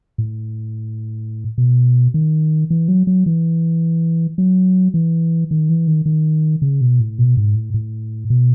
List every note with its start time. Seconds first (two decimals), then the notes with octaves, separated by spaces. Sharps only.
0.18 A2
1.58 B2
2.14 D#3
2.70 E3
2.88 F#3
3.07 F#3
3.26 E3
4.38 F#3
4.94 E3
5.51 D#3
5.69 E3
5.87 D#3
6.06 D#3
6.62 C#3
6.81 B2
7.00 A2
7.18 B2
7.37 G#2
7.55 A2
7.74 A2
8.30 B2